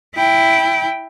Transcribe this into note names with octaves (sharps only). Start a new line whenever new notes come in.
E4 G5